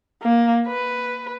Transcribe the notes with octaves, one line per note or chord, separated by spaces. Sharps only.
A#3
B4